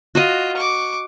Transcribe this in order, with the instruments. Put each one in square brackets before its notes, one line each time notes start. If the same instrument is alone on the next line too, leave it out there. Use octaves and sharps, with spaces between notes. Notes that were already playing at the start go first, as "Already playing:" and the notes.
[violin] F4 [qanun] F#4 D#5
[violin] C#6 D6